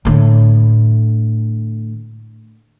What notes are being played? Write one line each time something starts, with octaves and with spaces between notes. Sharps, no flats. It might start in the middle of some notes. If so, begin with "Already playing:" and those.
A2 D3